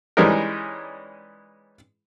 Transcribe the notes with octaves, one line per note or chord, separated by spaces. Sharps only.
E3 G3 G#3 C#4 D#4 A#4